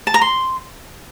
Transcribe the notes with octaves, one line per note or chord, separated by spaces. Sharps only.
A5
A#5
C6